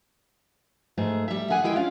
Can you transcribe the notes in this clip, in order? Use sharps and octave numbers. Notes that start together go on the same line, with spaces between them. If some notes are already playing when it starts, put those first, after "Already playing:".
G#2 A3 G#4
G3 E5
G#4 F#5 G#5
G#3 E4 G#4 G5
C#4 F4 F5